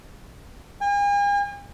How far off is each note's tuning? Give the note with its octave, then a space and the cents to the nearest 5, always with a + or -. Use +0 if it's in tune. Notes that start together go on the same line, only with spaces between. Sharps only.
G#5 -45